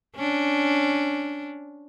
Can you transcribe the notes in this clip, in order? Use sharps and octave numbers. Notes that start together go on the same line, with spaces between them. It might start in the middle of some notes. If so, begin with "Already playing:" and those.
C#4 D4